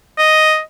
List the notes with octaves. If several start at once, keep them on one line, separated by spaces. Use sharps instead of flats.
D#5